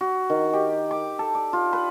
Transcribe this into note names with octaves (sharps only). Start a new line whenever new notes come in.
F#4
D#3
G4
D6
A4
D5
F4
B4